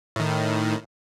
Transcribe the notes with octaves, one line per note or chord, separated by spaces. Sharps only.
A2 D#3